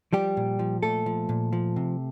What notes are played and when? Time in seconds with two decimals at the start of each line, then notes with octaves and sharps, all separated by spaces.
0.13 F3 G3 G4
0.37 A#2
0.59 F3
0.83 A#2 A3 A4
1.06 F3
1.29 A#2
1.53 F3
1.76 C3